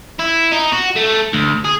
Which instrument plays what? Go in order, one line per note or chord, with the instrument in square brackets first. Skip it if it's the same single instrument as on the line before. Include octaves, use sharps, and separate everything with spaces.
[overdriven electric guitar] E4
D#4
F#4
A3
D2
G#4